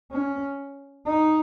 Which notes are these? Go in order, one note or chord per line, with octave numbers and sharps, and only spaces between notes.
C#4
D#4